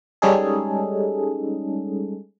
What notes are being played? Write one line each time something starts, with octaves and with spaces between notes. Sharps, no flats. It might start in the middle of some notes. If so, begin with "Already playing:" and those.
G3 G#3 C#4 D#4 G#4 A4